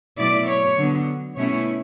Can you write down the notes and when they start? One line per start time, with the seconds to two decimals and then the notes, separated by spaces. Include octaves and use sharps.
0.18 B2 F#3 A3 E4 D5
0.48 C#5
0.77 D3 F#3 B3
1.36 B2 A3 C#4 E4 C#5